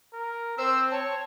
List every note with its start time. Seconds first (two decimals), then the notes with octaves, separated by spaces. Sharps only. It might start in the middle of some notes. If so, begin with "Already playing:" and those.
0.13 A#4
0.58 C4 C5 E6
0.91 C#5 A5